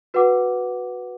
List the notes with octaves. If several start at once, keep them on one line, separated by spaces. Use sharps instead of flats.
F#4 B4 F#5 D6